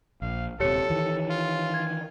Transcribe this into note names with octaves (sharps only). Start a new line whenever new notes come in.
A#1 F5
D#1 C3 G4 A4 C#5 C#7
D#3 E3
F4
G#6